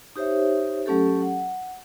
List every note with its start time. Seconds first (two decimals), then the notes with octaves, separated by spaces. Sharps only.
0.16 D#4 G4 C5 C#5 E5
0.86 F#3 A3 C#4 G4 A4
1.21 F#5